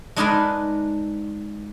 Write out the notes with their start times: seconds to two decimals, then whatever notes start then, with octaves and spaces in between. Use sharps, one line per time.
0.16 G#3 D4 D#4 G#4 A#4 B4